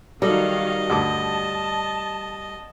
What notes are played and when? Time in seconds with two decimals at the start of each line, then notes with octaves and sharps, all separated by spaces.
0.22 D#3 F#3 G3 F#4 A4 D5 D#5 F5
0.90 D2 G2 A5 D6